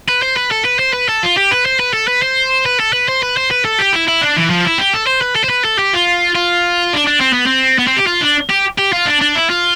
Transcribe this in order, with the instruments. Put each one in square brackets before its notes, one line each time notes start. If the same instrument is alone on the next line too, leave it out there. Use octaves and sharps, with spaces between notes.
[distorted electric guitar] B4
C5
B4
A4
B4
C5
B4
A4
F4
G4
B4
C5
B4
A4
B4
C5
B4
A4
B4
C5
B4
C5
B4
A4
G4
E4
E4
D4
E3
F3
E4
G4
A4
C5
B4
A4
C5
B4
A4
G4
F4
F4
D4
D4
C4
B3
C4
B3
C4
G4
F4
D4
G4
G4
F4
D4
D4
E4
F4